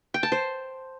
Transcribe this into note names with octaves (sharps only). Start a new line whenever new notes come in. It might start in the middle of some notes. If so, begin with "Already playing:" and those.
G5
A5
C5